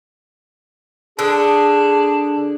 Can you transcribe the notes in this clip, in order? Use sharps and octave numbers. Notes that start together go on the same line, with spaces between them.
D3 D4 G#4